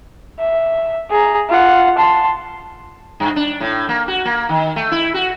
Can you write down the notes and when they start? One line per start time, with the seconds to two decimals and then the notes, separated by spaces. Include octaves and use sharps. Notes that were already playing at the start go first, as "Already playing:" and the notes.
0.40 E5
1.10 G#4 A#5
1.49 F4 F#5
1.97 A5 C6
3.20 G2
3.36 D4
3.60 A2
3.89 A#3
4.08 F#4
4.25 A#3
4.49 D#3
4.76 A3
4.91 E4
5.14 F#4